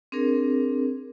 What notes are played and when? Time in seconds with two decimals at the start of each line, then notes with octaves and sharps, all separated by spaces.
0.12 C4 D4 G#4 A#4